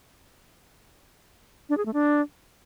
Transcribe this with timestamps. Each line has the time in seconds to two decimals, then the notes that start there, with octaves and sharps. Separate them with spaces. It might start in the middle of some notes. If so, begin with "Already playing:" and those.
1.69 D4
1.77 G#4
1.86 A3
1.94 D4